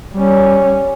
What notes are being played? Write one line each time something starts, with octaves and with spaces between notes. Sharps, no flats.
G3 C#4